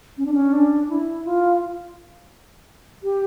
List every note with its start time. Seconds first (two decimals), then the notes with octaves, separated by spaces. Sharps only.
0.18 C#4
0.25 D4
0.34 C#4
0.53 D4
0.89 E4
1.25 F4
3.03 G4